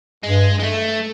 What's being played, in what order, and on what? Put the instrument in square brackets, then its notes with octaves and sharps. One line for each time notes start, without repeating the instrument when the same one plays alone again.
[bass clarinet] G2 [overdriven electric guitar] G#3
[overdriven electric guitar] G#3
A3